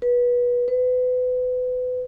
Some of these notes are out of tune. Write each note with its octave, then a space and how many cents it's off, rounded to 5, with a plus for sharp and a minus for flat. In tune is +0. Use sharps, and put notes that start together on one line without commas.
B4 -20
B4 +30